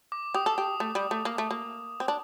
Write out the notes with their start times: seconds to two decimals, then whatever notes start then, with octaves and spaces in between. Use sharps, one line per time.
0.12 D6
0.34 G4 D#6
0.46 A4
0.58 G4
0.80 A3
0.95 G3
1.11 A3
1.25 A#3
1.38 A3
1.51 A#3
2.00 C4
2.08 D4